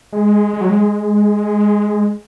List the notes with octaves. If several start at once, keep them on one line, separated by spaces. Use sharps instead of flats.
G#3
G#3
F#3
G#3